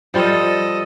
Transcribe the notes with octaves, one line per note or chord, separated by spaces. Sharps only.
F3 G3 F4 A4 D#5